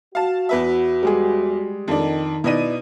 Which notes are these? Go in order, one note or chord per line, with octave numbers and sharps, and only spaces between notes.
F#4 F5 A5
E2 B4 E5
G3 G#3 G#4
F2 D#3 D4
B2 D#4 E4 B4 D5 D#7